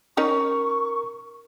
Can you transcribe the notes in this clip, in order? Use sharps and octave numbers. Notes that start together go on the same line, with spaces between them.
C#4 D#4 A#4 D#5 C#6